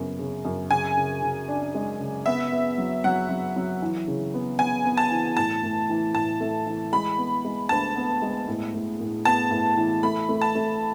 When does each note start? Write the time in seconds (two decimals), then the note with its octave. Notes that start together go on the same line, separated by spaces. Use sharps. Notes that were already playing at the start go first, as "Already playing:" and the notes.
Already playing: F#2 C#3 B3
0.19 C#3
0.45 F#2
0.71 C#3 G#5
0.97 C#3
1.23 C#3
1.48 D4
1.75 G#3
2.00 C#3
2.26 B3 E5
2.52 B3
2.78 F#3
3.04 F#3 F#5
3.29 F#3
3.56 F#3
3.82 E3
4.08 C#3
4.34 B3
4.59 B3 G#5
4.85 B3
4.97 A5
5.11 E3
5.37 A2 A5
5.63 A2
5.89 E3
6.14 A2 A5
6.41 A3
6.67 E3
6.92 G#3 B5
7.18 B3
7.45 G#3
7.69 D2 A5
7.96 B3
8.22 G#3
8.48 A2
8.74 A2
9.00 A2
9.25 B3 A5
9.51 A2
9.77 E3
10.03 A3 B5
10.29 A3
10.41 A5
10.55 A3